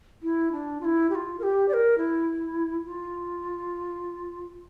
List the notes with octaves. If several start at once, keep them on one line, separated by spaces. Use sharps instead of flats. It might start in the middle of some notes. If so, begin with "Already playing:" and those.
E4
D4
F4
E4
G4
F4
A#4
G4
D5
A#4
E4
F4